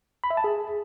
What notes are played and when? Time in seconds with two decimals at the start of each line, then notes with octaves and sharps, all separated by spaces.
0.24 B5
0.30 E5
0.37 A5
0.44 G#4